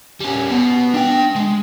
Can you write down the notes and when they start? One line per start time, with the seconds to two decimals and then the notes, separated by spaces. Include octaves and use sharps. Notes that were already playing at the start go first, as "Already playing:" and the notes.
0.20 G3 C#4
0.50 B2 B3
0.94 D4 G5
1.36 G#3